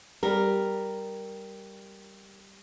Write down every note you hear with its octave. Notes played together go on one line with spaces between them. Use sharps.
G3 A#4